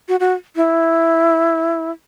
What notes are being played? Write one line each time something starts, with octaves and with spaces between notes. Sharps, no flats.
F#4
F#4
E4